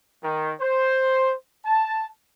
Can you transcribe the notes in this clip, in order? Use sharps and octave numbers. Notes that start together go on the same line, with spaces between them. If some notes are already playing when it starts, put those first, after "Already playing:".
D#3
C5
A5